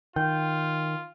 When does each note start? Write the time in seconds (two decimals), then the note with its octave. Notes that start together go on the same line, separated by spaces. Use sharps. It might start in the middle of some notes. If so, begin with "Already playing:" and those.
0.16 D#3 F4 G5